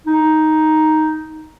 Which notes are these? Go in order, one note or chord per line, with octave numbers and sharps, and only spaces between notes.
D#4